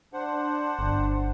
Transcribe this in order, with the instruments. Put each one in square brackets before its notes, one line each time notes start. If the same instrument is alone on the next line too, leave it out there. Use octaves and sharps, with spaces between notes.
[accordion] D4 C5 F#5
[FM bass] G1